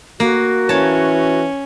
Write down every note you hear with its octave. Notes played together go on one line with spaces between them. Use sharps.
A#3 F#4
E3 C#4 C#5 A5